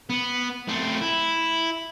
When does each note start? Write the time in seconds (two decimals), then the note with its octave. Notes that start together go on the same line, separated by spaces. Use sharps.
0.10 B3
0.69 A3 C4
1.01 E4